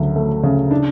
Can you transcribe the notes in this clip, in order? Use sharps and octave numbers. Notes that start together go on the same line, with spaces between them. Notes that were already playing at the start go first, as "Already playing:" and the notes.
Already playing: D2 C#3 F#3
A3
C#3
D4